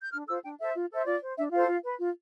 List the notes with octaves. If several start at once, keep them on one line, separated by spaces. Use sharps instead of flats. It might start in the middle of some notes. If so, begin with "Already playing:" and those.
G6
D4 F6
F4 A4 C5 E6
D4 G5
A4 C5 E5
F4
A4 C5 E5
F4 D5
C5
D4 E5
F4 A4 C5 F5
F4
B4
F4